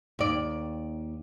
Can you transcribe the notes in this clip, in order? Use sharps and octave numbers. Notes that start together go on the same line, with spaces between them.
D#2 D5